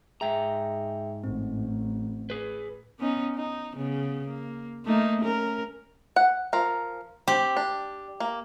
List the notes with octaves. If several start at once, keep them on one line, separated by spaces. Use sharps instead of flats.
G#2 G#4 E5 G5 A#5
A1 C4
G#4 B4
B3 C#4 D#4
D#4
C#3 B3
A#3
A3 A#3 D#4
C#4 A#4
F#5
F3 A#4
C4 G4
D4
A#3